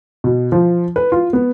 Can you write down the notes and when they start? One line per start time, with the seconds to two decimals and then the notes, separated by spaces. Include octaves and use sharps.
0.24 B2
0.52 F3
0.96 B4
1.12 F4
1.33 B3